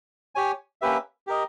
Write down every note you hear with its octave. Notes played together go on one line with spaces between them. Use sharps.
G4 C#5 G#5
A#3 C#4 G4 B4 E5
G4 A#4 D#5